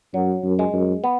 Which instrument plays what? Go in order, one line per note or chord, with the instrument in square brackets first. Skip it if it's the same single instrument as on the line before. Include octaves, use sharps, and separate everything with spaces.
[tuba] F#2 [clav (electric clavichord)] F#3
[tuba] F#2
[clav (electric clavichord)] G#3
[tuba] F#2
[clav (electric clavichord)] B3